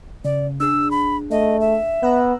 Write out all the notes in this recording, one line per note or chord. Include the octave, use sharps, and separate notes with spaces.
C#3 D5
D4 G#4 E6
B5
A3 D#5
E5
B3 A#5 E6 F#6